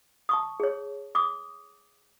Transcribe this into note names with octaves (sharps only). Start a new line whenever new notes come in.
A5 C#6 D#6
G#4 C#5
D6 D#6